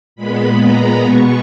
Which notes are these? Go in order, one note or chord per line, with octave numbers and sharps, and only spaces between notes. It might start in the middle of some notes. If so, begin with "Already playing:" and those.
A#2 G#3 B3 B5
A#5
B2 G#3 B3 C#6